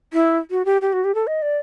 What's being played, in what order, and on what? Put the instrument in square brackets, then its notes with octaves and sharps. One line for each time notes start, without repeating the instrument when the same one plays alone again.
[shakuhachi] E4
F#4
G4
G4
F#4
G4
A4
D#5
D5